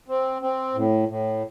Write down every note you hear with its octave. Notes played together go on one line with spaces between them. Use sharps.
C4
C4
A2
A2